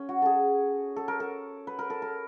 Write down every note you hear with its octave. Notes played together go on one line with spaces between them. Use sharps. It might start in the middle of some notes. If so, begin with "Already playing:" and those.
Already playing: C#4
F#4
G#4 A4
A4
A#4
A4
B4
A#4
A4
A#4